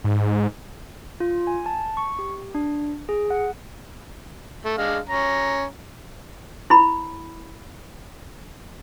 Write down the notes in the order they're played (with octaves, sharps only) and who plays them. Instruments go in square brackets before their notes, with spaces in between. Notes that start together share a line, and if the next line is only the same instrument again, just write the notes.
[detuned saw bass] G#2
[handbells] F4
G#5
A5
C#6
G4
D4
G#4
F#5
[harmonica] A3
G#3 D4 F5
C#4 A#5
[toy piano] E4 B5